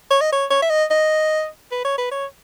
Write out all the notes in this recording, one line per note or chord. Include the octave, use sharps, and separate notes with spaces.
C#5
D#5
C#5
C#5
E5
D#5
D#5
B4
C#5
B4
C#5